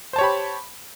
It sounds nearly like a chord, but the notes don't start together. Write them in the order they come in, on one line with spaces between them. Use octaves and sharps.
C5 A5 C#5 G4 B5